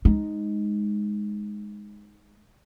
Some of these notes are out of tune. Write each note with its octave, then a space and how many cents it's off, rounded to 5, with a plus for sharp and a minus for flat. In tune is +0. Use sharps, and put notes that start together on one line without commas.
G#3 +0 D#4 +0